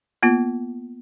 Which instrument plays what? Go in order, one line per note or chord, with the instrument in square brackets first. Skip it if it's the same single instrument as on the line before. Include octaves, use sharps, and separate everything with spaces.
[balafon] A#3 B3 F4